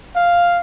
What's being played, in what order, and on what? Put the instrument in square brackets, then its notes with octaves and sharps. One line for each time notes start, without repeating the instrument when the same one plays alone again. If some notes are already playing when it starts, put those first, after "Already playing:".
[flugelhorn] F5